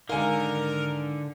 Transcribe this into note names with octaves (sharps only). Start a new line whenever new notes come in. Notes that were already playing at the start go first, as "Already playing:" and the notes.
G#2 D3 D#3 A#4 F5 G#5